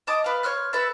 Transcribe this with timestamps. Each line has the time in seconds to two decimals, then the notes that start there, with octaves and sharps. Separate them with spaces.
0.07 D#5 A5 D6 D#6
0.24 B4 F5
0.43 C#5 C6 F6 F#6
0.73 A4 B4 E5 A5